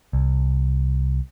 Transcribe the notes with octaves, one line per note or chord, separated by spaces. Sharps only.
C2